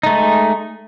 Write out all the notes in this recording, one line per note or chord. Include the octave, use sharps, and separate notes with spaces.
G#3 A3 D#4